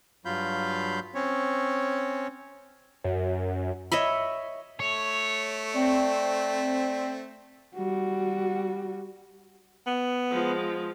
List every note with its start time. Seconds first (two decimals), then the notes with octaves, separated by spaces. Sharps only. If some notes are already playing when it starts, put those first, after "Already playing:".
0.25 G2 F#3 F4 F5 B5 G6
1.15 C4 C#4 C#5
3.04 F#2
3.92 C#5 D#5 E5 B5
4.80 A3 C#5
5.74 C4 D5 G5
7.76 G3 F#4
9.87 B3
10.31 F3 G#3